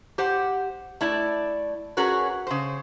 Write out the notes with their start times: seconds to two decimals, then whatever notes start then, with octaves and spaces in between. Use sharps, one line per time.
0.18 G4 C5 F#5
1.01 A3 E4 D5
1.97 C#4 F#4 G#4 A#4 B4 C#5
2.47 C#3 C5